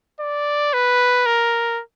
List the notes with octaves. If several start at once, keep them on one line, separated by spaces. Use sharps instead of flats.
D5
B4
A#4